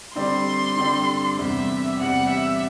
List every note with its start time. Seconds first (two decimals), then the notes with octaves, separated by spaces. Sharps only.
0.15 D3 G3 C4 G4 D5 C6
0.77 D3 G3 C4 G4 D5
1.38 E2 C3 G3 E5
1.99 E2 C3 G3 F#5
2.30 E5